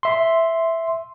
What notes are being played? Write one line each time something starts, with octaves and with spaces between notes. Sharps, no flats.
E5 C6